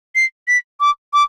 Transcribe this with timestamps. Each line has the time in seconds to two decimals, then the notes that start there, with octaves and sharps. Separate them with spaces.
0.15 C7
0.48 B6
0.80 D6
1.13 D6